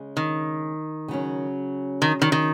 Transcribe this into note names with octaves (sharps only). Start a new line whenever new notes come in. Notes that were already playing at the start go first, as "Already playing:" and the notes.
Already playing: C#3 G#3 C#4
D#3
C#3 F#3 C#4
D#3
D#3
D#3